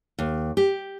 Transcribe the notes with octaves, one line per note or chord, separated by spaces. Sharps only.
D#2
G4